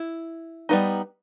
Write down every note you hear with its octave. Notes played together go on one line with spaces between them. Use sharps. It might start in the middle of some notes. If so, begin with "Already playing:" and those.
Already playing: E4
G3 B3 D#4